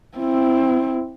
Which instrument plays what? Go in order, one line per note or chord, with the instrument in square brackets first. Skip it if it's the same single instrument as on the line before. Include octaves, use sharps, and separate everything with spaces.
[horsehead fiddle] C4 E4